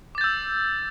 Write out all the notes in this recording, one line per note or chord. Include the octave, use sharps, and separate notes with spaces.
D6 E6 G6 A6